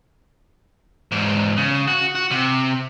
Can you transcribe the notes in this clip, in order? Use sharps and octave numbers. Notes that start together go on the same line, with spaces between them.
E2 G#2
C#3
F#4
F#4
C3